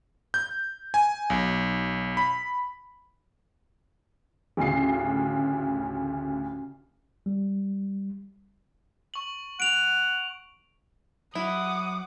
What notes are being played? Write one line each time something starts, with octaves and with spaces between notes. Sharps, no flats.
G6
G#5
B1
B5
A1 D2 C#3 C7
G3
C#6 F#7
F#5 D7 F7
F#3 E4 F#5 D6 D#6